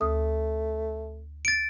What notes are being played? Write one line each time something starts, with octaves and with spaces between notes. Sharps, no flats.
D2 A3 D#6
A6 D7